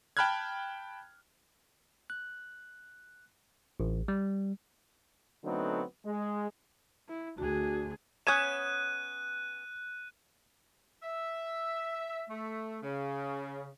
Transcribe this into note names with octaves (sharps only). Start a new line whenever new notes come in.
G5 A5 B5 F6 F#6 G#6
F#6
A1
G3
D3 F#3 A3 B3 C4 D#4
G#3
E4
D2 D4 F#4 G#4
B3 C#4 D#6 F#6 G#6 D#7 E7
E5
A3
C#3